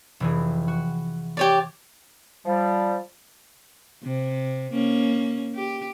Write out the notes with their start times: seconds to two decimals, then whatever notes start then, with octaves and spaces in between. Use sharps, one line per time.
0.20 F1 E3 G#4
0.68 F#4
1.37 G4 C#5 D5
2.46 F3 G3
4.04 C3
4.73 A#3 C#4
5.55 G4